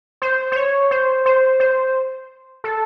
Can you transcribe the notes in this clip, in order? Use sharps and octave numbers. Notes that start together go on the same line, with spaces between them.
C5
C5
C#5
C5
C5
C5
A4